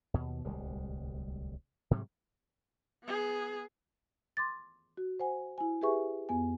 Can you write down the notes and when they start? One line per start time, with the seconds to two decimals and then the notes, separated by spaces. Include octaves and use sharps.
0.14 D#2 B2
0.45 D1 C2 G3 G#3
1.91 G#2 C3 F#3 G3
3.04 B3 G#4
4.37 C6 D6 A6
4.97 F#4
5.20 C5 F#5 G#5
5.58 E4 G#5
5.82 G4 G#4 B4 E5 G#5 C#6
6.29 F2 B3 G#5